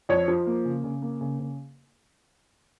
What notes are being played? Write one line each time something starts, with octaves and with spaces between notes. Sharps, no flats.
F2 C#5
F3
A#3
C#3
C#3
A#3
C#3
C#3